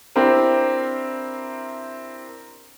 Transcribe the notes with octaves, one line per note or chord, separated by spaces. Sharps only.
C4 D4 E4 G4 A#4 C5